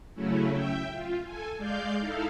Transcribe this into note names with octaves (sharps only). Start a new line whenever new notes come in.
C#3 F#3 A3 C#4 E4
E5 G5
F4
A4 G#5
G#3 D5 F5 G6
D#4 E4 A4 F5